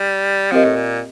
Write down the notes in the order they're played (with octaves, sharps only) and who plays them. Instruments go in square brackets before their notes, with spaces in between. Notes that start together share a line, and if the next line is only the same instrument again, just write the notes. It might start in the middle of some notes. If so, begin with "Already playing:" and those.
Already playing: [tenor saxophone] G3
[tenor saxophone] F3 [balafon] C4 G4 A#4 D#5
[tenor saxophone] A2
A#2